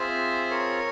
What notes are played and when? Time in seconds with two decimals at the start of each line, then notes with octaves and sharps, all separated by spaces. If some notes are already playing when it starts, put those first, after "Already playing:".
Already playing: C4 F4 G#4 C5 E5
0.50 A#4 C#5